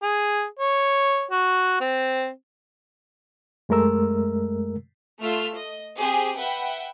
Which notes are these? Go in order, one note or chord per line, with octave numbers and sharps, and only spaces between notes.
G#4
C#5
F#4
C4
F#2 G#3 A3 A#4 E6
A3 F4 E6 F6
D#5
C4 G4 G#4
B4 E5 F#5 G5 B5